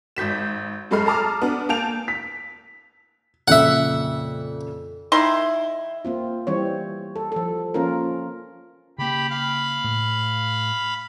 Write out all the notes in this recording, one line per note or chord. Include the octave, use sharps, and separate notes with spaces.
G#1 G6 B6 E7
F#2 G#3 A3 B5 F6 C7
A4 A5 A#5 D6 D#6 F6
B3 D4
A#3 G#5 A5 G6 D7 F7
B6
F2 A#2 C#3 E5 F#5
D#3 E4 C6
A#3 C4 F4
E3 G3 C4 C#5
A4
F3 A4
F3 A#3 C#4 F4 A#4
C#3 A#3 G4 B5
F5 B5
A2